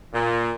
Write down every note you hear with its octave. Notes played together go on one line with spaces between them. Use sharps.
A#2